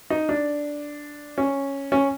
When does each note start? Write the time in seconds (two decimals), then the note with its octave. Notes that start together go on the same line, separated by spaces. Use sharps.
0.10 D#4
0.29 D4
1.38 C#4
1.92 C#4